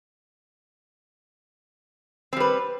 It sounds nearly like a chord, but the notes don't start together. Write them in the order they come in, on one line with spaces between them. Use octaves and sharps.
C4 G3 B4